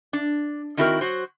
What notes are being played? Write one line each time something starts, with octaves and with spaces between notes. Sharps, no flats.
D4
D#3 C4 E4 F#4 G4 A#4
F#3 F#4 C5